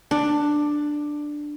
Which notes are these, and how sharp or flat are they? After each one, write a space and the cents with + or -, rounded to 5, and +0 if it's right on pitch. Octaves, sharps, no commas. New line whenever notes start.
D4 +10